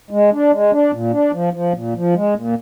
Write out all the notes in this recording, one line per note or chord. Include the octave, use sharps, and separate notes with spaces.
G#3
D4
G#3
D4
A#2
D4
F3
F3
A#2
F3
G#3
A#2